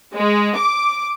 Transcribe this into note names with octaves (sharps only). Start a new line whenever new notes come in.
G#3
D6